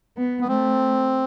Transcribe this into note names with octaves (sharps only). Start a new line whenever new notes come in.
B3
B3
A3 C4